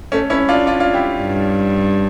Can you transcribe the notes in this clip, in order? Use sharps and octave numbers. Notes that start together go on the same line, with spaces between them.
A3 C#4
C#4 E4
D4 F4
D4 F4
D4 F4
E4 G4
G2